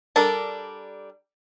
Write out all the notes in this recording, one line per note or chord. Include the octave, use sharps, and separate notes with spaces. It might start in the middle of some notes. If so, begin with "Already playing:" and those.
G3 D4 A4 A#4 A5